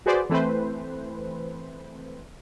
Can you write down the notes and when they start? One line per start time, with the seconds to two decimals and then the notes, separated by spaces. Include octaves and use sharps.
0.06 F#4 G#4 B4 C5 D5
0.30 E3 A3 C4 B4 C5